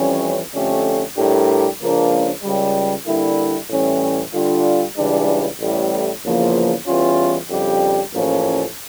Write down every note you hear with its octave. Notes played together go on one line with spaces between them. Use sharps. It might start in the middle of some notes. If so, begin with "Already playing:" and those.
Already playing: F2 E3 G3 C#4
F2 D3 A3 C#4 G4
A2 G3 D4 G4 A#4
C#2 C#3 F3 A#3 D4
C#2 C#3 G3
D3 G3 A#3 E4
A2 E3 G3 C#4
D3 G3 D4 F4
C#2 C#3 E3 G3 D4
A1 A2 G3
E2 C#3 F3 A#3
E2 E3 G3 C#4 F4
F2 C#3 G3 D4 G4
A1 A2 F3 A#3 C#4